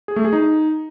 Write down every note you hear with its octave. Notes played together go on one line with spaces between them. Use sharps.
G#4
A3
G#4
D#4